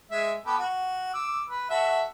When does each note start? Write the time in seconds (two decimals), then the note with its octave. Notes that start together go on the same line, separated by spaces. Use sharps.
0.11 G#3 E5
0.46 B3 G4 A4
0.58 F#4
1.14 D6 E6
1.50 B4
1.70 F#4 A4 E5